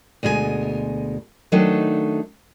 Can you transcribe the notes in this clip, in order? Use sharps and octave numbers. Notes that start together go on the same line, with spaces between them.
D2 B2 G#3 F#4 G#5
D#3 F#3 A3 D4 D#4